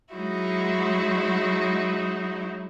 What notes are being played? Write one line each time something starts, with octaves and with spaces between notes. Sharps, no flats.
F#3 G#3 D#4 E4 F#4